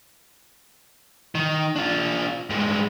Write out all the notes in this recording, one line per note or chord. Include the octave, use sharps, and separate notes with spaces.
D#3
D4 F4
G2 G#3